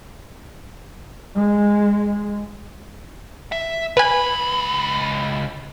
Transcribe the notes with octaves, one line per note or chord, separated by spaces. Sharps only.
G#3
E5
C#2 B4 G#5 B5